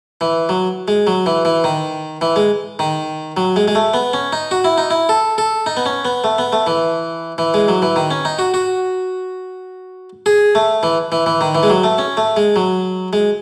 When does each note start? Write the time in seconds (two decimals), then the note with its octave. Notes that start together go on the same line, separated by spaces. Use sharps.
0.21 E3
0.49 F#3
0.88 G#3
1.07 F#3
1.26 E3
1.45 E3
1.64 D#3
2.21 E3
2.36 G#3
2.79 D#3
3.37 F#3
3.56 G#3
3.68 G#3
3.75 A3
3.94 B3
4.13 C#4
4.33 D#4
4.51 F#4
4.64 E4
4.78 D#4
4.90 E4
5.09 A4
5.38 A4
5.66 D#4
5.77 B3
5.86 C#4
6.05 B3
6.24 A3
6.38 B3
6.53 A3
6.67 E3
7.38 E3
7.54 G#3
7.68 F#3
7.82 E3
7.96 D#3
8.11 C#4
8.25 D#4
8.39 F#4
8.54 F#4
10.26 G#4
10.55 A3
10.83 E3
11.12 E3
11.26 E3
11.41 D#3
11.55 E3
11.63 G#3
11.70 F#3
11.84 A3
11.98 C#4
12.17 A3
12.37 G#3
12.56 F#3
13.13 G#3